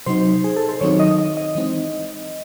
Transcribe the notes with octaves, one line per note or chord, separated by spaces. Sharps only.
C3 F#3 C4 D#4 C5
G#4
A4
C5
D#3 F#3 C4 D#4 C#5
D#5
D#5
D#5
E3 G#3 C4 D#4